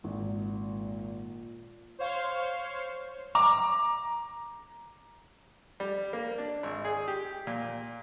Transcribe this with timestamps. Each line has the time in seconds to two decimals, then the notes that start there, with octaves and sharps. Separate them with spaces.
0.04 G#1 A#2
1.99 C5 C#5 F5 C6 C#6
3.35 A#5 D6
5.80 G3
6.13 A#3
6.38 D4
6.63 G#1
6.85 G#4
7.08 G4
7.47 A#2